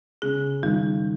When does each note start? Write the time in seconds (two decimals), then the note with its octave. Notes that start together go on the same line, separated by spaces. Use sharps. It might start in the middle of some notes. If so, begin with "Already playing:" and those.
0.22 C#3 G#4
0.63 D#3 G3